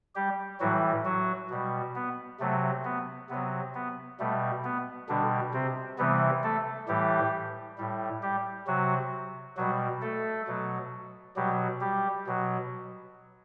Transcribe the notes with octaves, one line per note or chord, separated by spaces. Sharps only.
G3 G4
A2 E3 F#3 G3 F#4
F#3 F#4
B2 G3
B3
C3 F#3 A3
B3
C3 F#3 B3
B3
B2 G3 A3
B3
B2 D3 G3 D4
C3 C4
C3 E3 G3 B3
A3 A4
A2 E3 G3 G4
A2 G3
G3 G4
C3 F#3 F#4
B2 F#3 G3 F#4
A3 A4
B2 F#3
B2 F#3 G3 G4
G3 G4
B2 F#3